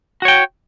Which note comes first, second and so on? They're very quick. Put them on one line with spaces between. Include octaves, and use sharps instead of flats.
F#4 C#5 G5